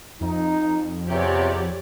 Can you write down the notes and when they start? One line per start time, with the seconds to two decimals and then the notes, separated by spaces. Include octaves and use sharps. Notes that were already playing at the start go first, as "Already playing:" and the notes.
0.21 F2 D#4
1.09 E2 C3 G4 C#5 D5